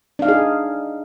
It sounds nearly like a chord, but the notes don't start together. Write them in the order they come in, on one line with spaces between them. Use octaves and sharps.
D4 F5 D#4 G#4